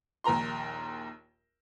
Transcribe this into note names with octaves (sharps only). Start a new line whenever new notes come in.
A#1 D#2 A#4 A#5 C6